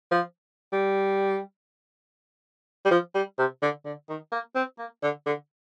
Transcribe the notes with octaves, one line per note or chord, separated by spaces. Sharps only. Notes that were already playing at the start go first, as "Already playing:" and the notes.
F3
G3
G3
F3
G3
C3
D3
D3
D#3
A#3
C4
A#3
D3
D3